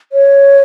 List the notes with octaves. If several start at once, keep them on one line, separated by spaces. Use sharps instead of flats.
C#5